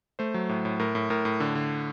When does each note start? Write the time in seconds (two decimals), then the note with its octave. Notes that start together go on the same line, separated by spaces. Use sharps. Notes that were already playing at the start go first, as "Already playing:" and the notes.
0.19 A3 C5
0.34 F#3
0.49 A2
0.65 A2
0.79 A2 A#4
0.95 A2
1.10 A2 A#4
1.25 A2
1.40 D3
1.55 D3